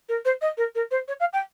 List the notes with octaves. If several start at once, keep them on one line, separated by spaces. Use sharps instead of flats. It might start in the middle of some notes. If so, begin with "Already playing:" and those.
A#4
C5
D#5
A#4
A#4
C5
C#5
F5
G5